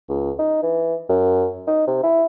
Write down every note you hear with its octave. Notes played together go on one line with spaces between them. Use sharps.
C#2
D#4
E3
F#2
D#4
C3
E4